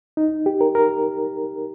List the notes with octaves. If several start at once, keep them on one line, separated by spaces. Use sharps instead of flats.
D#4
G4
A#4
A#4